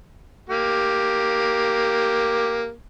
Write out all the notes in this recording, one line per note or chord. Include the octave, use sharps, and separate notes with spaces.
A#3 G4